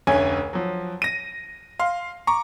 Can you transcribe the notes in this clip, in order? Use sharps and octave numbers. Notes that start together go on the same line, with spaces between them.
F1 D2 C#4 C#5 G#5
F3 F#3
A#6 D#7
F5 C6
A#5 C#6 D6